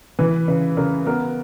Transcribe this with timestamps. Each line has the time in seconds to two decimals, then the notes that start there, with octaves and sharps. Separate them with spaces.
0.19 E3 B4
0.48 C#3 B4
0.77 C#3 A#4
1.06 B3 A#4